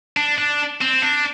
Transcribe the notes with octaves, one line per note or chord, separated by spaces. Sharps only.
D4
D4
C4
D4